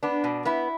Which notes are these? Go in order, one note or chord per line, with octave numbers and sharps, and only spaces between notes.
B3 D4
B2
B3 E4